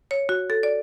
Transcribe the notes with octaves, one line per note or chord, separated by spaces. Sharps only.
C#5
F#4
A4
D5